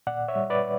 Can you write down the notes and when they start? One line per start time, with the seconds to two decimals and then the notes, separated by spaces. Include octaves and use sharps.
0.07 A#2 D5 F#5
0.28 C#5 E5
0.35 G3
0.50 B4 D5